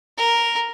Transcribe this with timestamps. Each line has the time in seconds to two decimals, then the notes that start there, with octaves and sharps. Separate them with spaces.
0.18 A#4